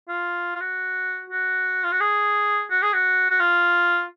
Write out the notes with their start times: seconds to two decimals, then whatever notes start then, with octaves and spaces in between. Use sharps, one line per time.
0.08 F4
0.55 F4
0.60 F#4
1.30 F#4
1.84 F4
1.92 F#4
2.01 G#4
2.70 F#4
2.82 G#4
2.93 F#4
3.30 F#4
3.40 F4